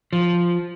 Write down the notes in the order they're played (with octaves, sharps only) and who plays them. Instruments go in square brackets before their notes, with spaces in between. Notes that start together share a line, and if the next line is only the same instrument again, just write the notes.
[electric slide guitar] F3